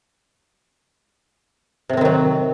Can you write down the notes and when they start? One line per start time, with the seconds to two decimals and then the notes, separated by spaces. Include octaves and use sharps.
1.90 C3
1.93 A2
1.97 C4
2.01 D#3
2.05 F#3